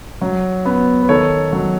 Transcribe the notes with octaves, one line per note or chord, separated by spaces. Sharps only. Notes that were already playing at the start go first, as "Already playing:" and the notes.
F#3
B3
B4
D#3 A4 C#5
F#3